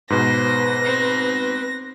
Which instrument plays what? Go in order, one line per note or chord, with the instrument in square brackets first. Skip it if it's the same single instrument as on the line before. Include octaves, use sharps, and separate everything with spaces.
[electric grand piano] G#2 B2 [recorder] B4 [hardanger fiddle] C5 [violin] A#6
[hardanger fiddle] C4